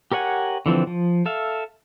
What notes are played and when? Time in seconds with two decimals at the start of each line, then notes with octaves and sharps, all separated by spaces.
0.12 G4 A#4 C#5 F#5 G#5
0.66 D3 E3 F3 C4
0.87 F3
1.26 A4 E5 F5